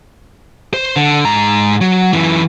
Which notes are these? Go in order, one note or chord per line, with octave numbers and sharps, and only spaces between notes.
C5
D3
G#2 A#5
F#3
F#2 E3